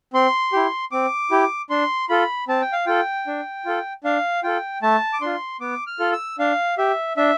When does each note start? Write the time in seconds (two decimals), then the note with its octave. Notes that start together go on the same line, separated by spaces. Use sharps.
0.13 C4 C6
0.53 E4 G4
0.92 C4 D6
1.31 E4 G4
1.70 D4 C6
2.09 F4 A4 B5
2.48 C4 A5
2.61 G5
2.73 F5
2.86 F4 A4 G5
3.27 D4
3.65 F4 A4
4.04 D4 F5
4.43 F4 A4 G5
4.82 A3 A5
5.13 D6
5.21 D4 F4 C6
5.60 B3 D6
5.87 F6
5.99 F4 A4
6.13 E6
6.39 D4 F5
6.78 G4 E5
7.17 D4 E5